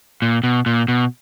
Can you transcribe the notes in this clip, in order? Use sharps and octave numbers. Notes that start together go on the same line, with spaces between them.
A#2
B2
A#2
B2